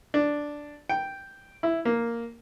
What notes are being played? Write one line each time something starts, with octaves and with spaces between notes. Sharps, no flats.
D4
G5
E4
A#3